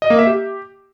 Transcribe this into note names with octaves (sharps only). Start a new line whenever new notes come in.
D#5
A#3
E5
G4